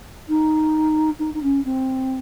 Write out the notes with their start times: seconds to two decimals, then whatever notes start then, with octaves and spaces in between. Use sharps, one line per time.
0.29 D#4
1.19 D#4
1.34 D#4
1.43 C#4
1.65 C4